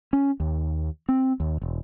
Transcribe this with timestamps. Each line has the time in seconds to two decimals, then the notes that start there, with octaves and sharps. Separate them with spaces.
0.13 C#4
0.40 D#2
1.09 C4
1.40 D#2
1.62 E1